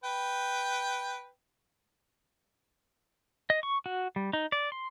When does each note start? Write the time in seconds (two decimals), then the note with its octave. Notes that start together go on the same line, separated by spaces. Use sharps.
0.04 B4 G5
3.50 D#5
3.63 C#6
3.86 F#4
4.16 G3
4.33 D#4
4.52 D5
4.72 C6